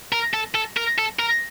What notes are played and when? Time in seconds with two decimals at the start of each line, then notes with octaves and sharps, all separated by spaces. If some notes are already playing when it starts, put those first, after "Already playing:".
0.12 A#4
0.34 A4
0.55 A4
0.77 A#4
0.98 A4
1.19 A#4